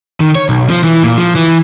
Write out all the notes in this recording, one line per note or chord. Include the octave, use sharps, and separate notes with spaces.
D#3
C#5
B1
F3
E3
A#2
F3
E3